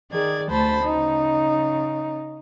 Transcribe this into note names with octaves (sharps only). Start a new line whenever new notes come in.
D#3 G#4 D5 G#6
D2 A3 C5 A5 B5
C#3 D#4